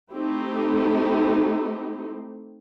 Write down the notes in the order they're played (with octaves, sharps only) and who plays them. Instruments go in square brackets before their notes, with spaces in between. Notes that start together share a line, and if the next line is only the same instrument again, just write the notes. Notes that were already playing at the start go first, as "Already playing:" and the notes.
[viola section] A3 C4 D#4 E4 G4